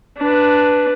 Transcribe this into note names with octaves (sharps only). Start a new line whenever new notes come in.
D4 B4